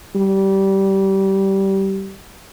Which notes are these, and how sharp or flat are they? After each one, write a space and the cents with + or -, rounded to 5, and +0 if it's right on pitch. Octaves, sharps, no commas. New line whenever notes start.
G3 -20